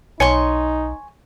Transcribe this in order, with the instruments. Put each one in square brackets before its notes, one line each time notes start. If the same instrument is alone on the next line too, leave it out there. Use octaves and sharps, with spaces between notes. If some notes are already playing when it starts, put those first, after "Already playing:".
[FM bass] B1 [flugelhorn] D#4 [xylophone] C#5 C#7 [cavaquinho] G#5 C6 C#6